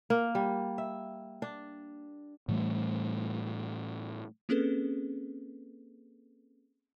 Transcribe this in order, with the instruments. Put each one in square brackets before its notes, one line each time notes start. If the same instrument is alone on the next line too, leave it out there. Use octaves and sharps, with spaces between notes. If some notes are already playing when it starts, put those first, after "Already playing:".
[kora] A#3
G3
E5
D4
[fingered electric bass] A2 E3 G3 A3
[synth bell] A#3 C4 C#4 G#4 A4 B4